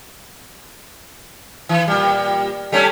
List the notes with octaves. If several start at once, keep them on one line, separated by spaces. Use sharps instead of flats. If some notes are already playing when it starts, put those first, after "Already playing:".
E3
A#2 G3
G3 A3 C#4